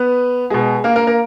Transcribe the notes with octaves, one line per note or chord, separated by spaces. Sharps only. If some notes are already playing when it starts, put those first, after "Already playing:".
Already playing: B3 B4
B2 G#3 G#4
A#3 A#4
A#3 A#4
A#3 A#4